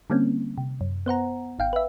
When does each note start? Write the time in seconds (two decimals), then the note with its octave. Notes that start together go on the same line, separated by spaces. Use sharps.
0.10 D3 G3 A#3 C4 C#4
0.58 C3
0.81 F#2
1.06 B3 C5 F#5 A#5
1.59 G#1 F5 G5
1.73 B4 E5